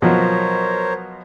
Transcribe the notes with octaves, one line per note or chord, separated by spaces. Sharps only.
B2 F3 F#3 A#4 C5 C#5